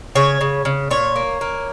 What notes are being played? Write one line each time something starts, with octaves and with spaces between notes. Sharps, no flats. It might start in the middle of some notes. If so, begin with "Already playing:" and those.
C#3 C#5
C#3
C#3
A#2 C#5
A#3
A#3